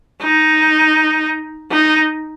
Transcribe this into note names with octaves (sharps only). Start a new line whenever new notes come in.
D#4
D#4